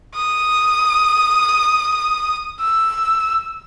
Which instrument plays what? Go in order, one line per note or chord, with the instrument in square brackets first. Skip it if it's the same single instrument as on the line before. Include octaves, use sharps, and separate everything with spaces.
[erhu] D#6
E6